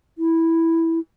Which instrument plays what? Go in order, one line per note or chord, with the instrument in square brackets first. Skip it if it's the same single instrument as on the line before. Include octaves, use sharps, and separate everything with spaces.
[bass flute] E4